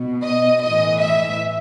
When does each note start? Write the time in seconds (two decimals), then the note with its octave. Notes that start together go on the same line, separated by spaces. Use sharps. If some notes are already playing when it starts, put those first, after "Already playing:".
Already playing: B2
0.23 D#5
0.62 A2 E3 D#5
1.01 E5